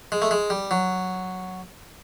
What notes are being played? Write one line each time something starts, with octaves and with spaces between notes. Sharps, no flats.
G#3
A3
G#3
G3
F#3